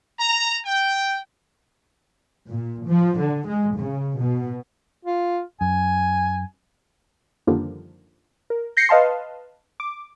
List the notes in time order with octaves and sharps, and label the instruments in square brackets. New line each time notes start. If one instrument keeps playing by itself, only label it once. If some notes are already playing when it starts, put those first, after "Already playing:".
[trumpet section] A#5
G5
[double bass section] A#2
F3
D3
G#3
C#3
B2
[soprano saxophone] F4
[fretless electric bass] F#2 [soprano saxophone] G#5
[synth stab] F#2 D3 D#3 F3 G3 A#3
A#4
G6 A#6 C7 C#7
B4 D#5 F5 A5 C6
D6